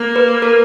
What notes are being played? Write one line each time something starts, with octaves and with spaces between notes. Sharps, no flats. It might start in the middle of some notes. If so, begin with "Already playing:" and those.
Already playing: A#3
B4
A#4